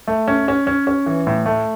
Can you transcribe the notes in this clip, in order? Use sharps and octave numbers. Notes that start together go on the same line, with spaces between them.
A3
C#4
C#4
C#4
C#4
E3
A2
A3